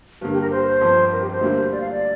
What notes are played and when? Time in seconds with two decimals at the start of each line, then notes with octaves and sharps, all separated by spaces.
0.21 G2 D3 A#3
0.32 G4
0.41 A#4
0.51 C5
0.81 G1 F2 F3
1.12 A#4
1.21 G4
1.31 C5
1.41 D2 D3 G3 A#3
1.72 D5
1.81 F5
1.91 D5